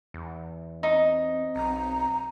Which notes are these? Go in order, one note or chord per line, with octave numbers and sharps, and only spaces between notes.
E2
C4 D#4
B1 A#5